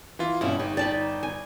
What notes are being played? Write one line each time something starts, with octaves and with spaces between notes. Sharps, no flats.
E3 F4
G2 B2 C#4 E4
G1 D#4 G4
D5 G5 A5 B5
G#5